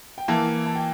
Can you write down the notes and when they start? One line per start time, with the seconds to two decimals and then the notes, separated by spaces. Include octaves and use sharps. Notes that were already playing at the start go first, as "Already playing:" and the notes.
0.18 G5
0.28 E3 A#3 E4 A5
0.66 A5
0.75 G5